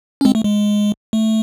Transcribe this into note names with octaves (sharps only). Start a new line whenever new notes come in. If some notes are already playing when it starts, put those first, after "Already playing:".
C#4
G#3 C4
A3
G#3
A3